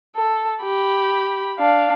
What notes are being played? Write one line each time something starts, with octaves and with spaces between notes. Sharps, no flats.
A4
G4 B5
D4 F5